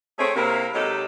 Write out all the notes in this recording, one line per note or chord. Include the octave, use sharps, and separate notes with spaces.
A3 C4 G#4 C#5
C3 A#3 C4 E4 A#4
C3 F#3 G#3 D#4 G4 A4